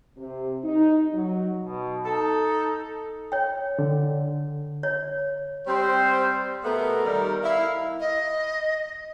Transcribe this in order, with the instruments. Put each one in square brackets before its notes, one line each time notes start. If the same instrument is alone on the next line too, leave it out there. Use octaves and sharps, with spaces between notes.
[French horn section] C3
D#4
F#3
[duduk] B2
[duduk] D#4 [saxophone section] A4
[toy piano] C#5 G5
[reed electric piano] D3
[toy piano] C#5
[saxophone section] G3 C4 [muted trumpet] C5
[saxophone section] B2 A3 B3 [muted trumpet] A#4
[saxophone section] D#3 G3
[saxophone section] E4 [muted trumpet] F5
[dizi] D#5